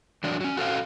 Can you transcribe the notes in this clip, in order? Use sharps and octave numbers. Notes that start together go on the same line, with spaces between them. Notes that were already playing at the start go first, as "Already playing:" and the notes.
E3 F#3 D4 D5
F#3 C#4
F#4 A4 C5 F5